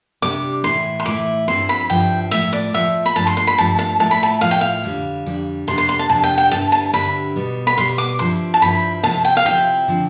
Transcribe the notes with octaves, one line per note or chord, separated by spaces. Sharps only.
C3 G3 D4 D6
A2 E3 A3 E4 C6
C6
A2 E3 A3 E4 D6
G2 F3 C4 E4 C6
B5
G2 F3 C4 E4 G5
A2 F3 A3 E5
D5
A2 F3 A3 E5
B5
G2 F3 A3 A5
C6
C6
B5
G2 F3 A3 A5
A5
A2 F3 A3 E4 A5
B5
A5
A2 F3 A3 E4 F5
G5
F5
F2 D3 G3
F2 D3 G3
F2 C3 G3 D4 C6
C6
C6
A5
F2 C3 G3 D4 A5
G5
G5
G2 D3 G3 C4 E4 A5
A5
G2 D3 G3 C4 E4 B5
B2 G3 B3
B5
B2 G3 B3 C6
D6
G2 F3 C4 E4 C6
A5
G2 F3 C4 E4 B5
C3 F3 C4 E4 A5
G5
F5
C3 F3 C4 E4 G5
D3 F3 C4